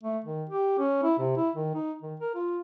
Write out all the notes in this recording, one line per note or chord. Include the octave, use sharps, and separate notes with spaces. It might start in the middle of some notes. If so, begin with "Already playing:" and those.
A3
D#3
G4
C#4
E4
C3
E4
D#3
D#4
D#3
A#4
F4